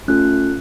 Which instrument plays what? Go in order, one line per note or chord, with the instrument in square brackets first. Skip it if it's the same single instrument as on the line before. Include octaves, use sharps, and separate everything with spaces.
[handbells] A3 C#4 F4 A4 F#6